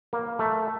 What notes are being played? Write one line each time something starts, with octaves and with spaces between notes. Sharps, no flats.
A#3
A3